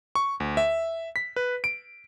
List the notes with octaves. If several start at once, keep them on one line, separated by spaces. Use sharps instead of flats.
C#6
D2
E5
B6
B4
D7